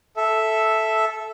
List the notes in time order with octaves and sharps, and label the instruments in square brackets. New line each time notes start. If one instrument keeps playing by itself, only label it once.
[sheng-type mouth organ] A4 E5